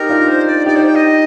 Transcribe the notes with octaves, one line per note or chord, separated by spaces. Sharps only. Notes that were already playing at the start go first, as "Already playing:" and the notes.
Already playing: D#4 G4 A#4
D4 F4
C5
D5
D#4 G4 D5
C5
G5
D#5